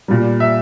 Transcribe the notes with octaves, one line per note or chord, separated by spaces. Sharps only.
A#2 G3
E5